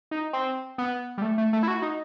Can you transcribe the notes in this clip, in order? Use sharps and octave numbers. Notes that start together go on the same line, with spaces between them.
D#4
C4
B3
G3
A3
A3
A3
E4
F#4
D#4